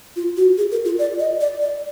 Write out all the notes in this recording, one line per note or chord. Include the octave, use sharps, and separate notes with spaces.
F4
F#4
G#4
A#4
F4
D5
D#5
D5
D5